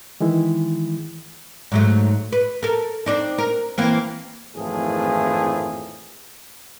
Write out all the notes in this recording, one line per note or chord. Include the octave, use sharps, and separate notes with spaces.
D#3 E3 G#3 E4
G#2 F#3 A3
B4
A4 A#4
C4 D4 D#4
A#4
E3 A#3 C4
G#1 F2 A2 E3 F3 G#4